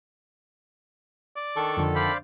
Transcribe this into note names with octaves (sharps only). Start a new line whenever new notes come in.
D5
D#3 D4 A4 C#6
F2 D3
C5 D5 F5 B5